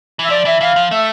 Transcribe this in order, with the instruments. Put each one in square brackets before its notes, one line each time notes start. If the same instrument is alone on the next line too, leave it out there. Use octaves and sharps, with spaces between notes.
[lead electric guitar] E3
[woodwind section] E5
[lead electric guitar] F3 [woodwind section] D5
[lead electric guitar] E3 [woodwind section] E5
[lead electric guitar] E3 [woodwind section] F5
[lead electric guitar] F3
[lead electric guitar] A3 [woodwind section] E5